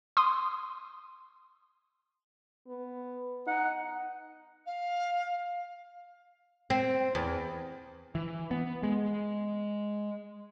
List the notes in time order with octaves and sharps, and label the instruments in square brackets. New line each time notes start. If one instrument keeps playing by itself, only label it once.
[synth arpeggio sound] C6 D#6
[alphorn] B3
[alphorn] D#4 [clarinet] F#5
[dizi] F5
[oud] C4
E2
[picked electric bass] E3
B3
G#3